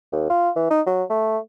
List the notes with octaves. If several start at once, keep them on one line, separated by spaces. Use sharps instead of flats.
D#2
F4
E3
D#4
F#3
A3